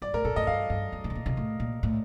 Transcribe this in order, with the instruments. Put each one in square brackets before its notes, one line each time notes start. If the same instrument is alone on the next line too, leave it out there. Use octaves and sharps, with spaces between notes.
[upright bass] G2 [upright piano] D5
[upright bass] A2 [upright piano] A#4
[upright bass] A#2 [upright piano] A4
[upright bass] A2 [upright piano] D#5
[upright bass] G2 [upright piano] F5
[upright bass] G2
G2
A2
C3
A#2
C3
A2
A#2
A2